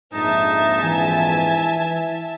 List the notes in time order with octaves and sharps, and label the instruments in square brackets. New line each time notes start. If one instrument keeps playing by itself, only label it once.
[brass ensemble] A#1 F2 G#2 [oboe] D#4 [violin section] E5 A5
[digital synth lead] E3 [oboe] G#5